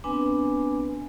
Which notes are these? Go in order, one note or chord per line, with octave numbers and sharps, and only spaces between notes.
B3 C4 D4 B4 G#5